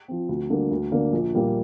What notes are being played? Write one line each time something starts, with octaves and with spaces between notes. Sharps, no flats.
F3 C4
D2
D3 G3 A#3 D4
D2
D3 A#3 D4
A#1
A#2 G3 A#3